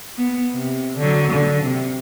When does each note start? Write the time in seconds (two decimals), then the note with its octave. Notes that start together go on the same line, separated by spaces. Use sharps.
0.17 B3
0.54 C3
0.97 D3 F#3
1.30 D3
1.64 C3